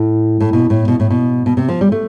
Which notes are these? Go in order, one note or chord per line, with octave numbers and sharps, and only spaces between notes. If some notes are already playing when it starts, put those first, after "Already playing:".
Already playing: A2
A2
B2
A2
B2
A2
B2
B2
C3
F3
G3
A3